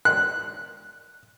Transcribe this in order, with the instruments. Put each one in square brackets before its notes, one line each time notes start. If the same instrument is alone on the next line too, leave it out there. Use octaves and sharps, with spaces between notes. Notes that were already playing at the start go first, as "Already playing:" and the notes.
[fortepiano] F#6